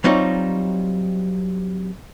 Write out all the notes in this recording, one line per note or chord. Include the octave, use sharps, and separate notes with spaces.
F#3 G3 C4 D#4 F4 C#5